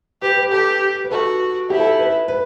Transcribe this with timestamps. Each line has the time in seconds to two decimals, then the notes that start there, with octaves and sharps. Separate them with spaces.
0.22 G4 B4
0.37 B4
0.52 G4 A4
1.04 B4
1.11 F#4 A4
1.70 E4 G4
1.80 A4
1.99 B4
2.28 B4